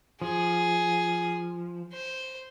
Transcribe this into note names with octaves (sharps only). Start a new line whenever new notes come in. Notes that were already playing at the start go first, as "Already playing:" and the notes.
F3 G#4
C5